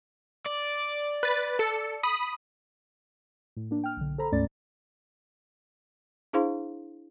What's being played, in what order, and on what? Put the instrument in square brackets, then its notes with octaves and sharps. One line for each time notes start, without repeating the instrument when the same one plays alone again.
[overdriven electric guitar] D5
[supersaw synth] B4 A6
A4 C#7
B5 D#6
[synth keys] A2
A#3 D4
G5 F6
B1 D3
A4 C5 A#5 B5
D2 G#2 A3 C#4 D5 A6
[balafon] D4 E4 G#4 C5 F5 C6